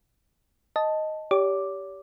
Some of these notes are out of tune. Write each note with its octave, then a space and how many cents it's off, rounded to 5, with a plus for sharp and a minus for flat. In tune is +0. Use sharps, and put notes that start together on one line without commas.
D#5 +5 A5 +0
G4 +0 C#5 +45 D6 +0